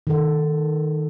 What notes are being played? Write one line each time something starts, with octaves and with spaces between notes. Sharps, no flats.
D#3 A4